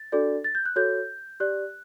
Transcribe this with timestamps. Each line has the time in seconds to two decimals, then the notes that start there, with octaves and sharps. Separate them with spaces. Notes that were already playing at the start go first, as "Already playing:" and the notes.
Already playing: A6
0.12 D4 F#4 A4 D5
0.44 A6
0.55 G6
0.66 F#6
0.76 F#4 A4 C#5 G6
1.40 G4 D5 F#6